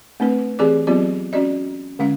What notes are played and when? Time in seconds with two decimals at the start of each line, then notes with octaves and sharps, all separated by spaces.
0.20 A3 C4 D4 B4
0.59 E3 C4 G4 G#4 D5 D6
0.87 F#3 B3 C4 F4 G4 D5
1.33 C#4 F#4 D5 D#5
1.99 D3 G#3 C#4 F5